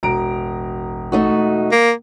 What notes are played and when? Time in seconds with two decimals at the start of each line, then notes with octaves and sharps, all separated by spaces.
0.03 E1 A1 A#5 D7
1.12 A3 D#4 F#4
1.72 A#3